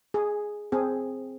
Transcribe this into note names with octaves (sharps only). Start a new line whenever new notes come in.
G#4
C4 G#4